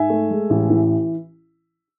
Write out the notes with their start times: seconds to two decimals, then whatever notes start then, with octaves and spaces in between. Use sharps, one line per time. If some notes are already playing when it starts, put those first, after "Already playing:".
Already playing: G#2 E5 G#5
0.10 A3
0.30 G#3
0.50 A1
0.70 E3